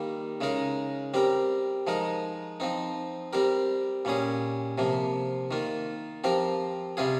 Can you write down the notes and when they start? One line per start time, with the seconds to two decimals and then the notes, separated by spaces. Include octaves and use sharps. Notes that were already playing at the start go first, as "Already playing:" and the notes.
Already playing: D#3 G3 A#3
0.41 C#3 G#3 D#4 A#4
1.14 G3 C4 G4 A#4
1.87 F3 G#3 D#4 A#4
2.60 F3 C4 D#4
3.33 G3 C4 G4 A#4
4.05 A#2 G3 C#4 G#4
4.78 C3 F3 A#3
5.51 D#3 A#3 F4
6.24 F3 C4 G4 A#4
6.97 C3 G3 C4 F4 G#4